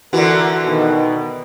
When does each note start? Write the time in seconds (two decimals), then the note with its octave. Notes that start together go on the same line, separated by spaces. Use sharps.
0.13 D3 E3 F#4 A#4
0.65 B2 D#3